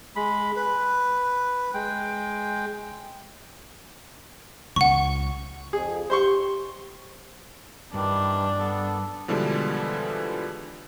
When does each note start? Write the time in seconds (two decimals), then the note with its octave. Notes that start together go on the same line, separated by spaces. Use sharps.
0.16 G#3 B5
0.56 B4
1.74 G#3 G5
4.76 C#2 F#5 C#6
5.73 F2 G#4
6.10 G4 C5 C6 C#6
7.94 G2 D#3 E3 G3 D4
8.59 B3 A4
9.28 B2 D3 E3 F3 G3 G#3